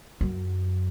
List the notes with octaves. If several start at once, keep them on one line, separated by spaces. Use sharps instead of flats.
F#2